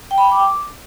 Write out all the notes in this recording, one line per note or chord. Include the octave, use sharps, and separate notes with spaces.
G5
B5
G5
D6